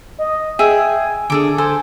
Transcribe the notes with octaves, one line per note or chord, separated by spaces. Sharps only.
D#5
G#4 E5 G5 G#5
D3 G#4 A4 D6
A4 C5 G#5